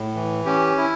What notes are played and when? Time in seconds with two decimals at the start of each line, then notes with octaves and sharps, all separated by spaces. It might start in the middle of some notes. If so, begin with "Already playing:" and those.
Already playing: A2
0.15 E3
0.46 C#4 G4
0.77 E4